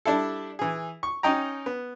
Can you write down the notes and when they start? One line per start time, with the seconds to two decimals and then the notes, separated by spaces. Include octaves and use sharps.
0.05 G3 D4 E4 A4
0.59 E3 G#4
1.03 C#6
1.23 C#4 D#4 D#5 G5 A#5
1.66 B3